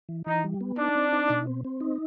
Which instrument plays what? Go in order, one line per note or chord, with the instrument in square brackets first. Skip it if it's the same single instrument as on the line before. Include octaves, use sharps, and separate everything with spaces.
[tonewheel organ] E3
[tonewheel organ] E3 [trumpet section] D#4
[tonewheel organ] G3
B3
[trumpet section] D4 [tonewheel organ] D#4
[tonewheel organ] C4
D#4
B2
C4
C4
D#4